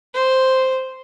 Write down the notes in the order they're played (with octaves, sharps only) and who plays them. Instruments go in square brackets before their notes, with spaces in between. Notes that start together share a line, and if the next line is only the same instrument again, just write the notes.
[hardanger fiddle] C5